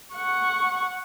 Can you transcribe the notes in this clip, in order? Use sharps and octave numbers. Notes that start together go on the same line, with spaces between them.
F#5 C#6